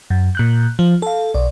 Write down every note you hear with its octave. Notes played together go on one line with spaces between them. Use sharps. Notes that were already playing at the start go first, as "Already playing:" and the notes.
F#2
A#2 F#6 G6
F3
A4 F5
B1 D5